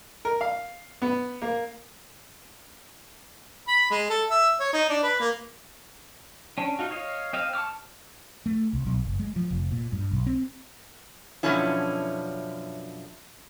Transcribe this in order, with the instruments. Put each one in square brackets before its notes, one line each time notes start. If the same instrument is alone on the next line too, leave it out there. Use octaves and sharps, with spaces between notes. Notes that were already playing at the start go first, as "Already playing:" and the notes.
[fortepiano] A#4
F5
B3
A#3
[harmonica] B5
G#3
A4
E5
C#5
D#4
D4
B4
A#3
[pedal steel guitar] C#4 D4
D#4 F4 F#4
C#5 D#5 F5
C4 D#5 F5
A5 C#6 D6 F6
[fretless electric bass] A3
C2
B1
F#1
G#3
F3
F1
A#2
G2
B1
C4
[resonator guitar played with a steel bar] F#2 B2 D3 F3 C#4 E4